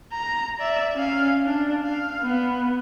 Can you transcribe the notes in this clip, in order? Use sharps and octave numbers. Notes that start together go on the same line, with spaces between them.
A#5
D5 E5
C#4 F5
D4
F5
B3